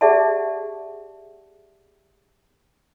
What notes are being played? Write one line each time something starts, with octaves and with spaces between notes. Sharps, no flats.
G4 G#4 D5 E5 F#5 A5